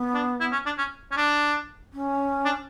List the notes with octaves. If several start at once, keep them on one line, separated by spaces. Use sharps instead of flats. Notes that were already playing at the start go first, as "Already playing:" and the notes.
Already playing: B3
D4
E4
C#4
D4
C#4
C#4
D4
C#4
D4